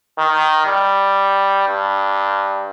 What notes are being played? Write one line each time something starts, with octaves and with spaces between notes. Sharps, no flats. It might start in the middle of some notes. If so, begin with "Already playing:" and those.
D#3
G3
G2